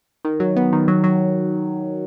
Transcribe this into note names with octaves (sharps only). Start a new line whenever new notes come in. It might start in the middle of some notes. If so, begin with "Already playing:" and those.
D#3
F#3
B3
D#3
F#3
F#3